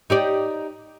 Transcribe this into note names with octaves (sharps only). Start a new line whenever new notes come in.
D#4 G4 D5